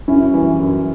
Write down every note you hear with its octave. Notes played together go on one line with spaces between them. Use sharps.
F#2 C#4 E4
E3 G3
F#2